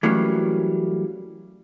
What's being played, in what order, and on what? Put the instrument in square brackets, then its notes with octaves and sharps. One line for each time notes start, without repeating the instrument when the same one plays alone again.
[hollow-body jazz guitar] E3 F#3 G3 A3 A#3 C#4